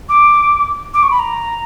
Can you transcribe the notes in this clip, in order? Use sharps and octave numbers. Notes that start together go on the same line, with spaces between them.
D6
D6
C#6
B5
A#5